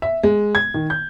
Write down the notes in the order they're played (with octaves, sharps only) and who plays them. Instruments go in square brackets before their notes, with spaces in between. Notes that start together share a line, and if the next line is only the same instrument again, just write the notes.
[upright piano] E5
G#3
G#6
D#3
G6